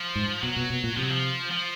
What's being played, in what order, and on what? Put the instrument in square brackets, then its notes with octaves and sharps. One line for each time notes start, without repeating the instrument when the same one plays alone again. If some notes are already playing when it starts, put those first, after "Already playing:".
Already playing: [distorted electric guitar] F3
[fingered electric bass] G#2
[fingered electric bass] B2 [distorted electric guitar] F#3
[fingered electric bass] B2
B2
A#2
[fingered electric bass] C3 [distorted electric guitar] F3
[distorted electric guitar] F#3
F3
F3